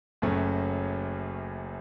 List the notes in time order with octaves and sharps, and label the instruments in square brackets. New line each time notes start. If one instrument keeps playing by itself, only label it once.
[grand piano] F#1 F#2 F#3 A3 C#4